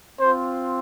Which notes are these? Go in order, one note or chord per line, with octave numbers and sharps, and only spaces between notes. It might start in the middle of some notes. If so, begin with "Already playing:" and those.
C4 F4 C5